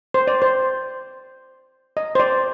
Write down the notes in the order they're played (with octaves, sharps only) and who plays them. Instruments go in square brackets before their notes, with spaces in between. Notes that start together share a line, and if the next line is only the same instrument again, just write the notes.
[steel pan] C5
D5
C5
D#5
C5
D5